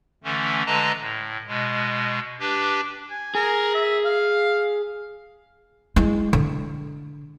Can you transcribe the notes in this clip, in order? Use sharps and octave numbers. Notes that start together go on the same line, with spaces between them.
D3 E3 A3 C#4
D3 G#3 B4 D#5 A5 A#5
A2
B2 G#3
D4 G4 B4
G#5
G#4 A#4
E5
F5
G#3 E4
D3